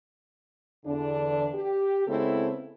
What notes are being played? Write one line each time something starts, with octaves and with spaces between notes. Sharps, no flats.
E2 D3 D4
G4
C#3 G#3 B3 C4 E4 A4